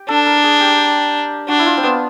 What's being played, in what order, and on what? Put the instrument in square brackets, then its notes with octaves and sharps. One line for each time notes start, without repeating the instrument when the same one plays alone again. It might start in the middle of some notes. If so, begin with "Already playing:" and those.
Already playing: [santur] G4
[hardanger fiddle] D4 [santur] A4
[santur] A#4
G#4
G4
[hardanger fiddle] D4 [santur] F#4
[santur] E4
F4
C4
B3